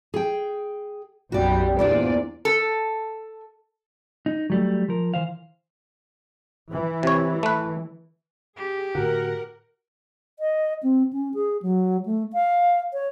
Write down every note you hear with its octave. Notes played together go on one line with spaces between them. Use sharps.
G#4 G5
B1 F#2 G3 F#4 D5
E2 A#2 D4 F4 C5 D5
A4
D#4
F#3 G3 A3
F3 A#4
E3 C5 F5
E3
C3 C#5
A3 B4
G4 G#4
A2 D3 F#4 A#4 F#5
D#5
C4
C#4
G#4
F#3
A3
F5
C#5